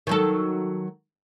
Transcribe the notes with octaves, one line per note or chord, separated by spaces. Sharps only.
D#3 F#3 A4